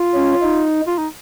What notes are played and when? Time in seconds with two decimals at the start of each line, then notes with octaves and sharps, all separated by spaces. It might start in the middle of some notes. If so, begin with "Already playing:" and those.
Already playing: F4
0.14 C#4
0.42 D#4
0.87 F4
0.98 D#4